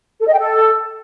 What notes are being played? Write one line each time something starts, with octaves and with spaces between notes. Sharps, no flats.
A4
D#5
G5
A4